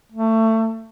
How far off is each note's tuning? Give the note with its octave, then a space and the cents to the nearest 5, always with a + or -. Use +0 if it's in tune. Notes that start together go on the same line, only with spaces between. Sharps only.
A3 +25